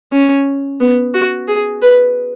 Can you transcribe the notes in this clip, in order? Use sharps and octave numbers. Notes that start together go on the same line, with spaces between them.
C#4
B3
F#4
G#4
B4